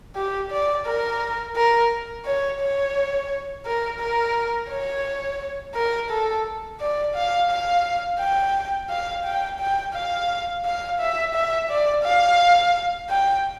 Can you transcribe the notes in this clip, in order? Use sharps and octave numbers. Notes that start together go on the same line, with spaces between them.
G4
D5
A#4
A#4
C#5
C#5
A#4
A#4
C#5
A#4
A4
D5
F5
F5
G5
F5
G5
G5
F5
F5
E5
E5
D5
F5
G5